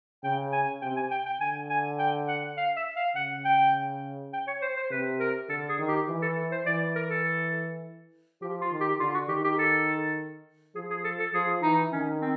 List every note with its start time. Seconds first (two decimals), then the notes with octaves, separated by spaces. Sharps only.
0.23 C#3 G5
0.52 G#5
0.82 C3 G5
0.96 G#5
1.11 G5
1.26 G5
1.40 D3 G#5
1.70 G#5
1.99 G5
2.28 F#5
2.57 F5
2.77 E5
2.96 F5
3.16 C#3 F#5
3.45 G5
4.33 G5
4.47 C#5
4.62 C5
4.76 C5
4.91 C3 B4
5.20 A#4
5.49 D3 A4
5.69 G#4
5.79 D#3
5.88 G4
6.08 E3
6.22 A4
6.51 C5
6.66 E3 D5
6.95 A#4
7.10 A4
8.42 F3 G4
8.61 F4
8.71 D#3
8.80 G4
9.00 D3 F4
9.14 F#4
9.29 D#3 G4
9.44 G4
9.59 A4
10.75 F3 G#4
10.90 G#4
11.04 A4
11.19 A4
11.34 F3 G#4
11.63 E3 D#4
11.92 D#3 C#4
12.21 C4